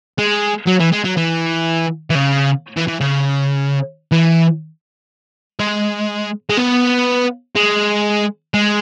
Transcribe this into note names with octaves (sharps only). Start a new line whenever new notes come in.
G#3
F#3
E3
G#3
F#3
E3
E3
C#3
E3
E3
C#3
E3
G#3
G#3
B3
G#3
G#3